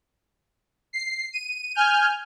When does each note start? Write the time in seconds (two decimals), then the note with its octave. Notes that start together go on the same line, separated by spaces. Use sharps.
0.93 C7
1.33 D#7
1.75 G#5 F6 G6